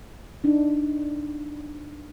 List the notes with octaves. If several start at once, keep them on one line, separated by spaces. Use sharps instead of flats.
D4 D#4